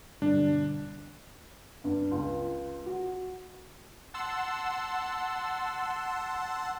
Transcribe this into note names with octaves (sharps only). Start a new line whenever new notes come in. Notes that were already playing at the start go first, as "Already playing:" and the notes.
G2 B2 D3 D4
G2
C#2
F#4
F#5 A5 C6 E6